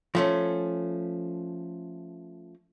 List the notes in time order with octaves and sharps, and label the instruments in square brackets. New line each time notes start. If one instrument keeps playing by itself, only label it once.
[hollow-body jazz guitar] F3 A3 C#4